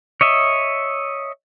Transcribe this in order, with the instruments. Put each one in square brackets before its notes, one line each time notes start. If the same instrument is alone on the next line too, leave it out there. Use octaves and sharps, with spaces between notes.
[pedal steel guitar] C#5 D#5 E5